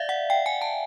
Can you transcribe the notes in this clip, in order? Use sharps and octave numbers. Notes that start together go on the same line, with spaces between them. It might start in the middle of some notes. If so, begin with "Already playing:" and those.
Already playing: D5 E5 F5
F#5
G5
G#5
A5